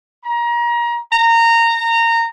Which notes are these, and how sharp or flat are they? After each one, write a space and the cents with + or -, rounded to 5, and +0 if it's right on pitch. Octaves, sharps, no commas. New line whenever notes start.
A#5 +30
A#5 -20